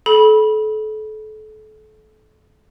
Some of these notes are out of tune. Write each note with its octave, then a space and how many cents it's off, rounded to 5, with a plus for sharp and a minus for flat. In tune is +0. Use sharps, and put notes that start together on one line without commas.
A4 -30 B5 -20